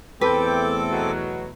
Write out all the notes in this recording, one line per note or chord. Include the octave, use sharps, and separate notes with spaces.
E2 A3 C4 A4 B4 G5 D6
B2 F#3